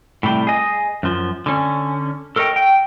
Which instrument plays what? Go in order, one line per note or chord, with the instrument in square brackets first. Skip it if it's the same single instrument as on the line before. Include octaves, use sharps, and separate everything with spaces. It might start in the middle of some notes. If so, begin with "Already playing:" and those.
[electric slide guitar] A2 C3 G3
G#4 D#5
F#2 F3
D3 C#4
A4 A#4 C#5 D#5 G5
G5